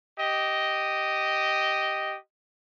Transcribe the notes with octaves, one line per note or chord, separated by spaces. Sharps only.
G4 D#5